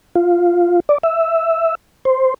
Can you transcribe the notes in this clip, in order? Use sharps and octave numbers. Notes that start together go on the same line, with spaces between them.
F4
D5
E5
C5